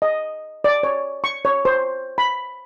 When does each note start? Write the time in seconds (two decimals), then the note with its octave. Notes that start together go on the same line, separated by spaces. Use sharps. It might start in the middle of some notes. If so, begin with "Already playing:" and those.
0.02 D#5
0.64 D5
0.83 C#5
1.24 C#6
1.45 C#5
1.65 C5
2.18 B5